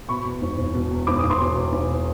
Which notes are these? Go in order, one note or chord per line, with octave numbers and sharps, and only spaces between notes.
B2 B5 C#6
E2
E1
E1
B2
E2
E1 D6
D#6
E1
C6 D6
B2
E2
E1